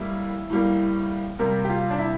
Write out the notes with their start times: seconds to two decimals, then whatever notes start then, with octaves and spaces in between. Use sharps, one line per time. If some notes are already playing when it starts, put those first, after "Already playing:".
Already playing: A2 G3 A#3 E4
0.50 A2 G3 A#3
1.39 C3 G3 A#3 A#4
1.64 G4
1.69 F4
1.90 D4
1.98 E4